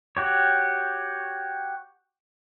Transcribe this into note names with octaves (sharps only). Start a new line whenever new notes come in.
F#4 G4 C#5